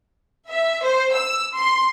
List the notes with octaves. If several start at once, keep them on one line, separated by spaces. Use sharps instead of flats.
E5
C5
E6
C6